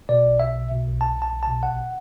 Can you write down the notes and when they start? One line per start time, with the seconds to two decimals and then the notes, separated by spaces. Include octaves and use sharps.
0.09 B2 D5
0.24 B1
0.39 B2 E5
0.56 B1
0.71 B2
0.87 B1
1.01 B1 A5
1.17 B1 A5
1.33 B1
1.43 B2 A5
1.63 A1 F#5